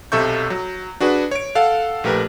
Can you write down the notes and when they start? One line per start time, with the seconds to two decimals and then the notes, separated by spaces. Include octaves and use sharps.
0.12 B1 C3 A4 E5 C#6 G6
0.50 F#3
1.00 D4 F#4 G#4 B4
1.31 C#5 D7
1.55 A4 F5 F#5
2.04 A#1 A3 G4 A#4 B4